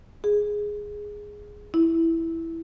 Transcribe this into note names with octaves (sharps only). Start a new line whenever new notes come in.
G#4
E4